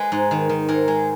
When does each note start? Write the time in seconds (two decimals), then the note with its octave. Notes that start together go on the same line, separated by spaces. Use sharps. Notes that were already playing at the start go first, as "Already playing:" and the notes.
Already playing: G#3 B4
0.12 G#2
0.31 D#3
0.49 D#3
0.69 G#2 A#4
0.88 G#3